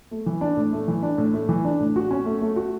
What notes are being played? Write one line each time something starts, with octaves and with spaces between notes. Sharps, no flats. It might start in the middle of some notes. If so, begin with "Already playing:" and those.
A3
E3
D4
A2
A3
E3
D4
A2
A3
E3
D4
A2
F#4
C#4
A3
A3
F#4